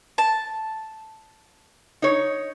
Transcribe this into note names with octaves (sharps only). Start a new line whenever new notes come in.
A5
D#4 C#5